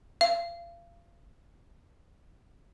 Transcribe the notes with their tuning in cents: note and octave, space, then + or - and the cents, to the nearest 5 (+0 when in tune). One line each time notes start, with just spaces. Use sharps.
F5 -30